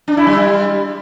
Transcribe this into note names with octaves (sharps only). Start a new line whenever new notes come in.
D4
E4
G3